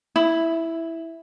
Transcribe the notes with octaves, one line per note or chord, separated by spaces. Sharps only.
E4